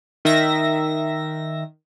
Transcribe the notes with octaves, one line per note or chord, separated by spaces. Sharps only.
D#3 E5 A#6